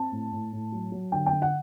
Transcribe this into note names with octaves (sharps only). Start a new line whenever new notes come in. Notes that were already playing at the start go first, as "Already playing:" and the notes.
Already playing: C4 A5
A2
A2
A2
F#3
F#3
D3 G5
G5
D3
F#5